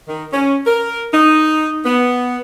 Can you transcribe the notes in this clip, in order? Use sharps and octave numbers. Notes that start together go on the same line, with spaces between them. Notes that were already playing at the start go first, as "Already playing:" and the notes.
D#3
C#4
A#4
D#4
B3